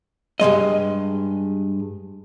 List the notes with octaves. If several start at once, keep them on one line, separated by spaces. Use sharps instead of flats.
G2 F#3 G#3 D#5